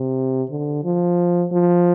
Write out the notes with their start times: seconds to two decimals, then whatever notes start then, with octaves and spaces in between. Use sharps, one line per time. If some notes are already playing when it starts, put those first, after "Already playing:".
Already playing: C3
0.50 D3
0.84 F3
1.51 F3